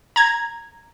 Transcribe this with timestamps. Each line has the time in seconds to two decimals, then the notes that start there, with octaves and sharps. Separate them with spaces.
0.16 A#5 G#6